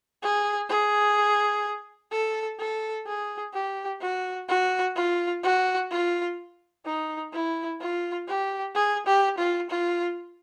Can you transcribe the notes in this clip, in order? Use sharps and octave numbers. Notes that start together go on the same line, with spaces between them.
G#4
G#4
A4
A4
G#4
G4
F#4
F#4
F4
F#4
F4
D#4
E4
F4
G4
G#4
G4
F4
F4